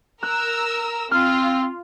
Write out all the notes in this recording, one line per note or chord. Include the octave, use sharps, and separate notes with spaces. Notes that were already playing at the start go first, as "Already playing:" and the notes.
A#4 A#5 E6 F#6
C4 F4 F6